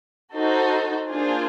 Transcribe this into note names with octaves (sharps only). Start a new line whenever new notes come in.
D#4 F#4 A4 C5
A#3 D4 F4 G#4 C5